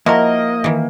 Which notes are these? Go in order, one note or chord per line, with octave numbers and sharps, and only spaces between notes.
F3 A#3 E4 F#4 A#4 D#5
D#3 E3